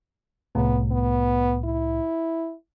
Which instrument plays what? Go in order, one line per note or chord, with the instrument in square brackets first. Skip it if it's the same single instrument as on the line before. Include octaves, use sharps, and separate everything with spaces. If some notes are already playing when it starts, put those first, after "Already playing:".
[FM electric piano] C2 A2 [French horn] B3
[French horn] B3
E4